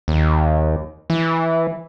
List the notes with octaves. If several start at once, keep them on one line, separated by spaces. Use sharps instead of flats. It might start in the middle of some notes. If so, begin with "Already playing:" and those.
D#2
E3